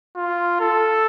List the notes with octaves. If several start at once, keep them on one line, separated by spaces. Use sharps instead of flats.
F4
A4